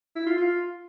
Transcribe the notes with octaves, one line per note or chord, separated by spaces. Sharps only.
E4
F4
F4